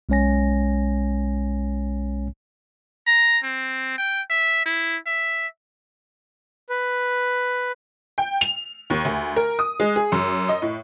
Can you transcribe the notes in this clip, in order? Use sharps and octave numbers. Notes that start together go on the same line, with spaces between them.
B1 G#3 C#4 C#5 G#5 A#6
A#5
C4
G5
E5
E4
E5
B4
G5
F7
D#2
D2
A#4
D#6
G#3
G#4
F#2
D#5
A2